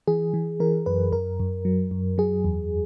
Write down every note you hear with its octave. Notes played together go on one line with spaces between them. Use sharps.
E3 G#4
E3
E3 A#4
F#2 B4
F#2 A#4
F#2
F#3
F#2
F#3 G#4
E2